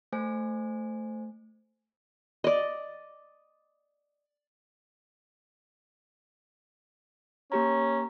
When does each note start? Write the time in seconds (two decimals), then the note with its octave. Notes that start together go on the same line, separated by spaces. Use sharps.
0.12 A3 C5 G#5
2.44 D5 D#5
7.52 A#3 C#4 G4 A#5